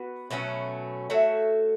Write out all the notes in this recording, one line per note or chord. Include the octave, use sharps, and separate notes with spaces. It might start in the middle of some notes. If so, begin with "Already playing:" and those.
Already playing: B3 F#4 B4
B2 F#3 A3 C#4
A3 F#4 C#5 E5